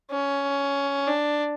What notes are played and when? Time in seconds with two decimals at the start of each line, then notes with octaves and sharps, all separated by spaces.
0.11 C#4
1.08 D4